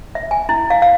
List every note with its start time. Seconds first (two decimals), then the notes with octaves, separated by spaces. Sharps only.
0.15 E5
0.31 G#5
0.49 E4
0.70 F5
0.82 F5